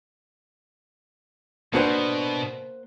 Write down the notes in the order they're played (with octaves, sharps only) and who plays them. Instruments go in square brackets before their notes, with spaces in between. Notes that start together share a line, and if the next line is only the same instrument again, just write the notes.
[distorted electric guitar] B2 [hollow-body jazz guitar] A#3 F#4 C5 [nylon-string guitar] B3 D4 B4